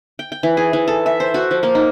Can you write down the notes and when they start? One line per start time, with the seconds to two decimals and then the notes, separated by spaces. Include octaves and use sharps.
0.19 G5
0.32 G5
0.43 E3
0.57 G#4
0.73 E3
0.88 A4
1.06 E5
1.20 C5
1.34 F#4
1.51 F3
1.63 A#3
1.75 D#4